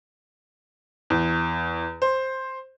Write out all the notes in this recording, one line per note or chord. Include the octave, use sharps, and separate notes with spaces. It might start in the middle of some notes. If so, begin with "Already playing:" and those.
E2
C5